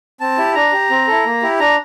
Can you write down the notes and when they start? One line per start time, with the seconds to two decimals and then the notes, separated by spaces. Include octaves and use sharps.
0.21 C4 A5
0.38 E4 G4
0.55 D4 A#5
0.72 G4
0.90 C4
1.07 E4 A4
1.25 A#3
1.42 E4 G4
1.60 D4 A#5